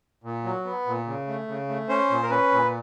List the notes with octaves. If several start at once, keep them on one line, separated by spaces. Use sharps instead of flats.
A#2
F#3
B3
A#2
C#3
A3
C#3
A3
C#4 C5
A#2
A#4
C#4 B4
A#2